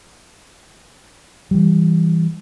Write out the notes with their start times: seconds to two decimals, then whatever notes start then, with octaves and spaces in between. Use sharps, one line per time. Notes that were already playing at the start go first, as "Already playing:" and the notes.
1.51 E3 G3